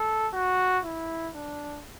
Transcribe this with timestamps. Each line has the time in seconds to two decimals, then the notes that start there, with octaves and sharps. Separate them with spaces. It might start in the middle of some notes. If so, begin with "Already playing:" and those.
Already playing: A4
0.34 F#4
0.84 E4
1.35 D4